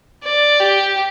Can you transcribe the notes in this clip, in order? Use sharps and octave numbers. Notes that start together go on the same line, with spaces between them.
D5
G4